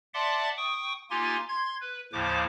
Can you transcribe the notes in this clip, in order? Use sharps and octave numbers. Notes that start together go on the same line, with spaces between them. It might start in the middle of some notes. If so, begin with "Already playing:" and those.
D5 E5 F#5 A5 C6 D6
G5 C#6 D#6
A#3 D#4 F4 G4 G#5 C6
C6 G#6
B4
D#2 A2 C#3 F3 C5 D6